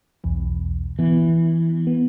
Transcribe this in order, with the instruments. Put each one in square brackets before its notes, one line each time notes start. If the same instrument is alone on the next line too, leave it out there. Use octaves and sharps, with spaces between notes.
[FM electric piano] B1 E2
[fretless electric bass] E3 [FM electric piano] B3
[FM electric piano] B3